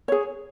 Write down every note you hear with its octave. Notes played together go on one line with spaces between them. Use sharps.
G#4 C#5